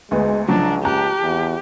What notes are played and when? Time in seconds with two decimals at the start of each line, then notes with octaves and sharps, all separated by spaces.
0.11 D2 G#3 B3
0.48 C#2 C#3 F3 F#3 D4
0.85 G4 A5 A#5 F#6
1.22 E2